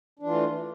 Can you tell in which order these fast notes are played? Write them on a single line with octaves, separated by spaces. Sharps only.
D4 E3 F4 A3